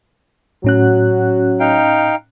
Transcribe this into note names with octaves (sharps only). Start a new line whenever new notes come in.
A2 F#3 C#4 F#4 F#6
D#4 F5 G5